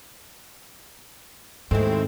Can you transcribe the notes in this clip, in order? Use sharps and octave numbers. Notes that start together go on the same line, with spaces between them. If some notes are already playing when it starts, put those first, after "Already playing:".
D#2 G#2 G#3 A3 C4 E4